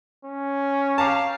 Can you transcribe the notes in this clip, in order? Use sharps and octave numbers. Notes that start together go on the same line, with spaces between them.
C#4
G4 F5 A5 A#5 D6